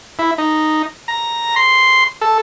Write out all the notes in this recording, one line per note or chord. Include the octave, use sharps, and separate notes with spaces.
E4
D#4
A#5
C6
A4